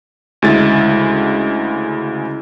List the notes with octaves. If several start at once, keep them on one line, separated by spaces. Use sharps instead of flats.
D2 C#3 G#3 E4 A6